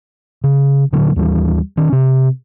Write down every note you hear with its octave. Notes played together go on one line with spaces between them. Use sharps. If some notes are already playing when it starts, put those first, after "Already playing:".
C#3
A#2 D3 F#3
D#2 E3 G3
D#3 C#4
C3